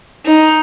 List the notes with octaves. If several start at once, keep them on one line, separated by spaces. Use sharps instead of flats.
D#4